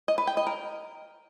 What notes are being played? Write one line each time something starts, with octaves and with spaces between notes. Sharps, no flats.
D#5
B4
G5
D#5
A#4